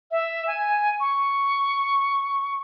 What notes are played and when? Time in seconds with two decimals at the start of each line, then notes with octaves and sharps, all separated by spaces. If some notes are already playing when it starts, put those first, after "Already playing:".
0.11 E5
0.47 G#5
1.00 C#6